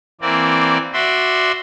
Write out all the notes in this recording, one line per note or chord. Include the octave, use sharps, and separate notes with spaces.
E3 A#3 C4 D5
F#4 D5 E5 C6